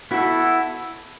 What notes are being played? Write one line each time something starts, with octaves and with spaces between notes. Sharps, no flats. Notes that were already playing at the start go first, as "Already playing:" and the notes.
B3 E4 F#4 A4